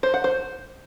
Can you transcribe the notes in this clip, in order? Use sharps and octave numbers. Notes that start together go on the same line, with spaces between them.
C5
F#5
C5